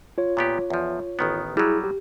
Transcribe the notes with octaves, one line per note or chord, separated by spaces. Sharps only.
F4 C#5
A#2 B3 G4
E2 F3
A1 D#3 B3
F#3 G3 E4 G#4
G4